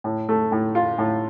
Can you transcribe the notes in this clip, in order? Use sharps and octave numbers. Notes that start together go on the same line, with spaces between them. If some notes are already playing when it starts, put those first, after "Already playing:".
A2
A3
A2
F4
A2